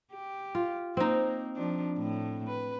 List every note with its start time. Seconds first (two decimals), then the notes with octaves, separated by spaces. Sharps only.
0.12 G4
0.55 F4
0.97 A#3 C4 D#4
1.56 F3 D4
1.97 A2
2.47 B4